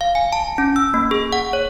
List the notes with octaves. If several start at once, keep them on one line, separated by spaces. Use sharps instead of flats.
F5
G#5
A5
C#4
E6
A#3
G#4
F#5
C#5